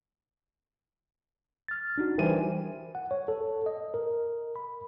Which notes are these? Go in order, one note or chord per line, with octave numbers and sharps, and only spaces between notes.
F6 A6
D4 D#4 F#4
E3 G3 A#4 C5 G#5 D#7
F#5
C#5
A4
D#5
A#4
B5